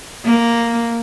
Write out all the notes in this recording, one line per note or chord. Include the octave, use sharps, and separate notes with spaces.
A#3